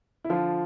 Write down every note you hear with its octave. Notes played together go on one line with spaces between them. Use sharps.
E4
D3 F3 F4